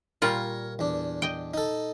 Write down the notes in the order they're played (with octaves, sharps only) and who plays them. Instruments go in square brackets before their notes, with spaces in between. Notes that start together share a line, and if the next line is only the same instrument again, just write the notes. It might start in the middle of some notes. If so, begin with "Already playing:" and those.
[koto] A#2 G3 F4 [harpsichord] A#4 C#5
[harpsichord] E2 D4
[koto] D#5 G5
[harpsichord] D#4 A4